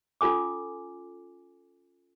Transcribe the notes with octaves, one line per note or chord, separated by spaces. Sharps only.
C#4 F4 A4 G#5 D6